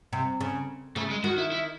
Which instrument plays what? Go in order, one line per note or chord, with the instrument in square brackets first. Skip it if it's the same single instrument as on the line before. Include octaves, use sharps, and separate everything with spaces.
[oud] C3
C#3
[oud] C#3 [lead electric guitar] A3
[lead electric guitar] G#3
[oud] D#3 [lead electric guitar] F#4
[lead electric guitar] E4
E4